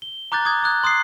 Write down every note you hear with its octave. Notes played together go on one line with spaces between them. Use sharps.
G7
A#5 D6 F#6 G6 A6
D6 D#6 G#6
D6 D#6 F#6 G#6
C6 D#6 F#6 C7